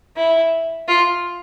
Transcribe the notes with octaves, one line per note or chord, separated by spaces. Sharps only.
E4
F4